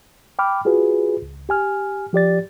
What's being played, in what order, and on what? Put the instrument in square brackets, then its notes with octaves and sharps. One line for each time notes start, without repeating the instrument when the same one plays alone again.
[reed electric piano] G5 B5 D6 F6
F4 F#4 G#4 B4
C#2
G4 G#5 F6
F3 G4 D5 A6